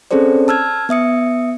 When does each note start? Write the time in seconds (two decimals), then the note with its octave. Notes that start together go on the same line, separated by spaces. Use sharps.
0.11 C4 C#4 G#4 A4 C5 D5
0.48 A5 E6 F6 G#6
0.89 B3 E5 D#6 C#7